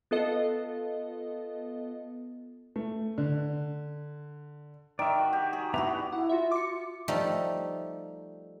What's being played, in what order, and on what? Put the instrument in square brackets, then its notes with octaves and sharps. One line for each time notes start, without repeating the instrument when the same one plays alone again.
[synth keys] B3 F4 A4 D#5
[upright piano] A3
D3
[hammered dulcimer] D#3 [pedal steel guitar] D5 E5
[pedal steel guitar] F#4
[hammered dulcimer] G4
G#4
[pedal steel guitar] B3 E5 A#5 [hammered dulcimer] D4 E4 F#4
[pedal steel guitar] G4
[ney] E4 [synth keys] F#5
[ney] F4 [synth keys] F#4 E5
[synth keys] D6 C#7
[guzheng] F3 G3 A3 D#4